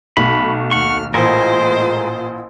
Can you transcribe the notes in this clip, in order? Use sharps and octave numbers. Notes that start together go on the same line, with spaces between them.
B1 A3 B5
D#2 F#5 C#6 F6
A1 A#2 G#3 A3 F4 A#4 C5 D#5